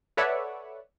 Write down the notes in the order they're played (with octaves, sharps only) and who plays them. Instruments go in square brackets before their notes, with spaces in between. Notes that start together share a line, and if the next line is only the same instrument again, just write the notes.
[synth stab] A4 B4 C#5 D5 E5 F#5